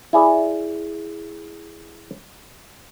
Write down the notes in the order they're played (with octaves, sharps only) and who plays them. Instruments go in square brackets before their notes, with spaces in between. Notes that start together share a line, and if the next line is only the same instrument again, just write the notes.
[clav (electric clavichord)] E4 G#4 D5